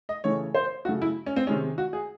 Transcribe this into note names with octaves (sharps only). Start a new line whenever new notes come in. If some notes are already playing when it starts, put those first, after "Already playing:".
D#5
C#3 E3 A3 C#5
C5
C#3 F#3 A3 F#4
E4
C#4
C4
C3 D#3 G#3 C#4
F#4
G#4